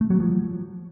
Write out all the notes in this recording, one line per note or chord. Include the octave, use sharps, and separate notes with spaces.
A3
F#3
F3